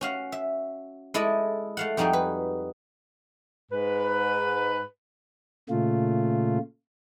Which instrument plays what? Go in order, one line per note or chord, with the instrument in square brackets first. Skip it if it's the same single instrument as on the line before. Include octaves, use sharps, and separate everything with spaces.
[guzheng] C#4 F#4 F5
E5
G#3 E4 A4 D5 D#5
A3 F5 F#5
F2 G3 D#4 F#4 G#4 G5
B4
[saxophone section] G#2 B4
[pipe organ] A#2 C#3 A3 F4